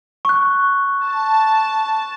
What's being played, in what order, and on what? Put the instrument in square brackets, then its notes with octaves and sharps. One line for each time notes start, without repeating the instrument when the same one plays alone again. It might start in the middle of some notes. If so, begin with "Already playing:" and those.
[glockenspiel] C#6 F#6
[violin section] A5